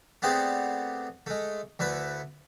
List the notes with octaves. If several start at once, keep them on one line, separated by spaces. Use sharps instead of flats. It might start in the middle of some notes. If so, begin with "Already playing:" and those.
A3 B3 C4 G4 G#4 D5
G#3 A3
D2 A3 E4 B4